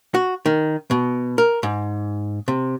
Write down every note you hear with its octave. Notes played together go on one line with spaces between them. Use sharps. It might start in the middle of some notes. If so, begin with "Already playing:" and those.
F#4
D#3
B2
A#4
G#2
C3